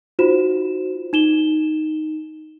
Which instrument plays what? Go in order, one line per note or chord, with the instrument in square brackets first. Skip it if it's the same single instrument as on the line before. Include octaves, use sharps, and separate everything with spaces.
[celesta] D#4 F4 F#4 C5 E7
D#4 E7 G7